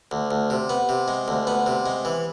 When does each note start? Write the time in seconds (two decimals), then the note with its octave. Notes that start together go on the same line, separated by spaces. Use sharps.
0.11 D2
0.31 D2
0.50 C3
0.69 B3
0.89 C3
1.08 G#3
1.28 D2
1.47 B3
1.66 C3
1.86 G#3
2.05 E3